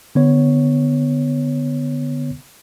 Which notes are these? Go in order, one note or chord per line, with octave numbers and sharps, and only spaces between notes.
D3 B3 C#5